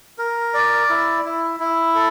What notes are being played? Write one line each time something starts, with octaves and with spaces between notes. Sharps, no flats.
A#4
D5
E4
E4
E4
A4